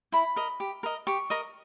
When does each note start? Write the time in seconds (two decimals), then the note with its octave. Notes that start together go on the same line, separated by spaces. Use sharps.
0.12 E4 B5
0.36 A#4 D#5
0.60 G4
0.83 A#4 D#5
1.07 G4 C#6
1.30 A#4 D#5